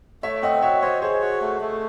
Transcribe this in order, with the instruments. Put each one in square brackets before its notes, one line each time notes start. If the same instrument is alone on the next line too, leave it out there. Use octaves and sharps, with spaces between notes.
[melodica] A3 [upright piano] C#5 E5
[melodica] C4 [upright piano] D#5 F#5
[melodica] F#4 [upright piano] C#5 E5
[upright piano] C5 D#5 [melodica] C#5
[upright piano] G#4 C5 [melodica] C#5
[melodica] F#4
A3
A3